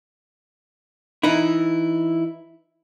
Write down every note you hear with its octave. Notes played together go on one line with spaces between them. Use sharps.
E3 D#4 E4